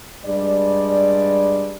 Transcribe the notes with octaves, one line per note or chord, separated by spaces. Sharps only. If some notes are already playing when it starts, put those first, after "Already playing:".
G2 G3 G#3 D5